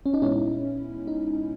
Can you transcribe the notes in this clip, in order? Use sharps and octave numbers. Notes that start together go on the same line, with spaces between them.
C#4
D#4
A#2 G#3 B3 C#4 E4
D#4